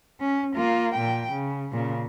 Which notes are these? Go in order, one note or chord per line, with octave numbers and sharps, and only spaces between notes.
C#4
A#3 F4
A#2 G5
C#3
A#2 C#3